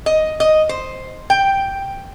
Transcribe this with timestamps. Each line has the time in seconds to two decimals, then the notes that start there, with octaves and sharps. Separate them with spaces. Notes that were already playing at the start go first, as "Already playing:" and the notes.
0.06 D#5
0.40 D#5
0.69 C5
1.30 G5